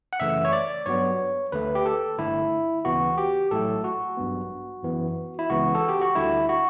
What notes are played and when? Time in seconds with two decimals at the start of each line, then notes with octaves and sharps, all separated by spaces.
0.13 F#5
0.20 F#2 C#3 E3 A3 E5
0.45 C#5
0.53 D5
0.86 G2 F#3 B3 C#5
1.52 D2 D3 A3 B4
1.75 G4
1.86 A4
2.18 G1 G2 D3 A3 E4
2.85 D2 C#3 E3 B3 F#4
3.18 G4
3.51 A1 A2 F#3 A3 A4
3.84 F#4
4.17 A1 G2 F#3 B3
4.83 F#2 E3 B3
5.39 E4
5.50 C#2 C#3 E3 B3 F#4
5.75 A4
5.88 G4
6.02 F#4
6.15 D2 D3 G3 E4
6.49 F#4